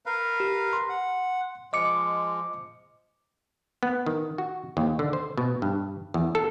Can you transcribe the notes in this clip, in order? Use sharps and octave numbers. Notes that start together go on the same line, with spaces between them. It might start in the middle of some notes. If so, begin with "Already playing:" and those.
A#4 B4 F5
G4
C6
F#5
F3 G#3 D#5 D6 C#7
B3
D#3
F#4
D#2
D3
C5
B2
G2
E2
A4